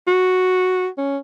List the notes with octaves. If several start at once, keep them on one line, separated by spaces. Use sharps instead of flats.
F#4
C#4